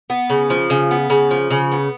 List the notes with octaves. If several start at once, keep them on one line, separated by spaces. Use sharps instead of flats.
B3
C#3
F3
C#3
B3
C#3
F3
C#3
B3